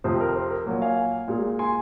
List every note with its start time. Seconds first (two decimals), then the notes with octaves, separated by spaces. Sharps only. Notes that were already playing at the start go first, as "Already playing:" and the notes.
0.04 F2 C3 F3 C5
0.20 A#4
0.36 C5
0.51 A#4
0.66 A#2 F#3 A#3
0.82 F5 G#5
1.28 A#2 G#3
1.59 G#5 C6